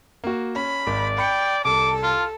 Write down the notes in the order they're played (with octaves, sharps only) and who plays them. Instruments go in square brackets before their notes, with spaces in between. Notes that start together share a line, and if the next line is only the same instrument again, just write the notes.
[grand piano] A#3 F#4
[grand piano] C#4 [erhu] B5
[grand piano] G#1 [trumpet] D5
[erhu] G5 [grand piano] B5 C#7
[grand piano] C2 [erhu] A4 [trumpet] D6
[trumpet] F4